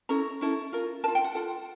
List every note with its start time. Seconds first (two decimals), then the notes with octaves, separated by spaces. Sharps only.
0.09 C#4 E4 A4 A#5
0.41 C#4 E4 A4
0.72 F4 A#4
1.04 A#4 A5
1.08 F4
1.15 G5
1.24 F#5
1.35 F4 A4 F#5